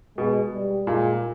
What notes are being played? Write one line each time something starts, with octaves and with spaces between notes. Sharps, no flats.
B2 G#3
G3
A#2 G#3